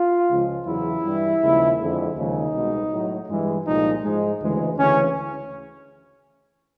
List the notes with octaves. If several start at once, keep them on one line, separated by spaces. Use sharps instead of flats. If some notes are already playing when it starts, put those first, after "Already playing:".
Already playing: F4
C#2 C#3 F3 G#3
E2 C#3 F#3 E4
G2 E3 G3
D#2 C#3 F3 G#3
F2 D3 F3 G#3
D#2 C#3 F3 G#3 D#4
C2 B2 G#3
A2 F#3
G2 E3 G#3
C2 A#2 F3 G#3 D#4
G#2 F3 G#3
D2 C#3 E3 G#3
D2 C#3 E3 C#4